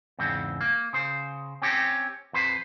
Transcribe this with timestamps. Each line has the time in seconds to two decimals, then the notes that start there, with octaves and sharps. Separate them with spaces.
0.19 E2 G#2 C#3 C4
0.61 A#3
0.93 C#3 C5
1.62 C4 C#4 G4
2.33 F2 B4 C5